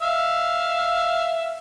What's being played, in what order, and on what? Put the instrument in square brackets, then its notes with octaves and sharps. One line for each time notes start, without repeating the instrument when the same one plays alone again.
[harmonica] E5 F5 E6